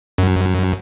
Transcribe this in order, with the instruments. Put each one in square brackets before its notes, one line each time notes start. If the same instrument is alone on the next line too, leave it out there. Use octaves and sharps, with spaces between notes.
[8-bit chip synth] F#2